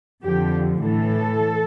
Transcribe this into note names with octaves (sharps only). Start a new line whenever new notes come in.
F2 D3 F3 G4
A2 E3 A4